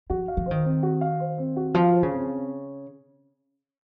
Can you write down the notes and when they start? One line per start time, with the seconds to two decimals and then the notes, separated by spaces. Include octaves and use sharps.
0.10 F3 F#4
0.28 F5
0.37 F3
0.46 D#3 C5
0.65 C4
0.83 F#4
1.01 F5
1.20 C5
1.38 C4
1.56 F#4
1.74 F3 F5
1.94 C5
2.03 C#3
2.12 C4